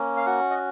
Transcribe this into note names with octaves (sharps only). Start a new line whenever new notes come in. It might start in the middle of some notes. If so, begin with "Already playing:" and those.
Already playing: A#3 C#4
F5
F#4 F#5
D#5